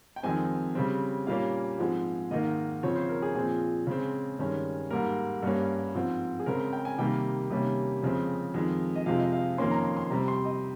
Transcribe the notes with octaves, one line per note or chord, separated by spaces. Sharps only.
G5
F2 D#3 G#3 C4 G#5
C#3 G3 C4
A#2 G3 A#3 C#4 F5
G#2 F3 G#3 C4
G#2 D#3 A#3 D#5
C#3 F3 C4 C#5
C5
A#4
G#4
A#2 F3 C4 G#4
C#3 G#3 C4
G2 D#3 G#3 C#4
G#2 G3 A#3 A#4
G2 G3 A#3 C#4
G#2 F3 C4
G#4
C#3 G#3 C4 A#4
G5
G#5
C3 D#3 G3 A#3 G5
C3 D#3 G3 A#3 C#4
F2 C#3 G#3 C4
F2 D#3 G#3
D#5
F2 C3 F3 G#3 C4 F5
D#5
F5
F2 D#3 A#3 C#4 C6
A#5
C6
C6
C3 G3 C4 A#5
C6
D#5